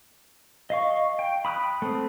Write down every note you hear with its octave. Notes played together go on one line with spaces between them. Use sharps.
D#5 F5 C#6
G5
B5 D#6 F6 F#6
A3 C4